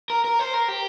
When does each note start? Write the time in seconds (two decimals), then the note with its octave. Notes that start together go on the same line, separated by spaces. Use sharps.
0.10 A#4
0.24 A#4
0.39 C5
0.54 A#4
0.68 G4